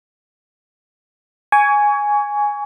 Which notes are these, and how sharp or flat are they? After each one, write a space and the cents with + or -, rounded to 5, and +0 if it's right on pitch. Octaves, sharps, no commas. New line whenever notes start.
G#5 +0 C#6 +30